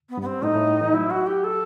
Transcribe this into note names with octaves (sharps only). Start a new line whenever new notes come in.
B3
G2
B3
C4
A2 D#4
A2
E3
F#3 E4
F#4
G4
A4